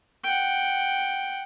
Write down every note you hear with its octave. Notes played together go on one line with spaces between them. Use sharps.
F#5 G5